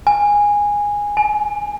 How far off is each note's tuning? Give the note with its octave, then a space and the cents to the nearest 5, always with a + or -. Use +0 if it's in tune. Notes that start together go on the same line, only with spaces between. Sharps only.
G#5 -10
G#5 +25